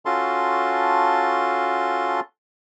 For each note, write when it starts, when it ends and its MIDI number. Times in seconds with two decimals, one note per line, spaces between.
0.06 2.20 61
0.06 2.20 65
0.06 2.20 66
0.06 2.20 69
0.06 2.20 81
0.06 2.20 84